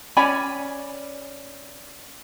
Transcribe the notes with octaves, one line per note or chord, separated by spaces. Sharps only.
C#4 D5 G#5 B5